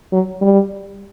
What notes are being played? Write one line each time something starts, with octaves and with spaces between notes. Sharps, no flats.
F#3
G3